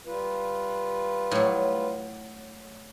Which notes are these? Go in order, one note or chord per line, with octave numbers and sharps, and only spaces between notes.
G3 F4 B4
A2 F#3